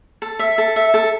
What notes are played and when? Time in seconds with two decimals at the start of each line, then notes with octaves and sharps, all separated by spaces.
0.22 A4
0.39 E5
0.58 A4
0.76 E5
0.94 A4